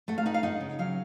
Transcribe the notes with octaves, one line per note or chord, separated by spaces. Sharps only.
A3 F#5
F5
D#4 F#5
F5
D#4 F#5
C#3
F#3 F5